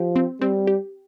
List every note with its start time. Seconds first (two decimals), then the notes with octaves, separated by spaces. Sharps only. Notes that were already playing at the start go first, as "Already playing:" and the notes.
Already playing: F3 G4
0.16 C4
0.41 G3 C4
0.67 G4